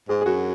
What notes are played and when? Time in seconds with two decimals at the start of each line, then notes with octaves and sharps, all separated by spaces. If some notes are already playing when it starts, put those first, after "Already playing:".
0.09 G#2 G#4
0.21 G#4
0.26 F#2 F#4